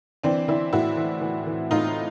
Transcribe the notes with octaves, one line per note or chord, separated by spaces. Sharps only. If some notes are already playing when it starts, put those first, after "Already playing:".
E3 C4 D4
E3 D4 E4
A2 E4 F#4
E3
E3
E3
A2 D#4 F4